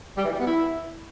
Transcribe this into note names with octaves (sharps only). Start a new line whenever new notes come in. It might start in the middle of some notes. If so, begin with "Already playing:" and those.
G3
E3
G3
B3
E4